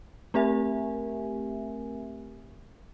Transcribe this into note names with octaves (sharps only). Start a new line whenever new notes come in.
A3 C4 G4 A#4 E5 G#5